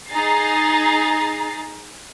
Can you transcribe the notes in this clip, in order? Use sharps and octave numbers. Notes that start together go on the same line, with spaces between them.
D#4 G#4 A#5 A6 C7